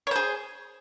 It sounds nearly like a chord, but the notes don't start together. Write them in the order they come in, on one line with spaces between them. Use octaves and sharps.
C#5 C5 G#4